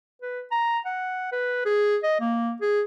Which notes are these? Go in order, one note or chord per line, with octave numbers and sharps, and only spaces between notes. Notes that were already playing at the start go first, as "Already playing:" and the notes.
B4
A#5
F#5
B4
G#4
D#5
A#3
G#4